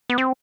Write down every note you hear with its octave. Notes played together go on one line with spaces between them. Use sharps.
B3
C4